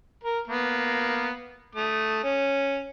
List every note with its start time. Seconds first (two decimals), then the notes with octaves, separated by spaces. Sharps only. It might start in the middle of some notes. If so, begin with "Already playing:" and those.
0.23 A#4
0.47 A#3 B3
1.75 A3 D#6
2.23 C#4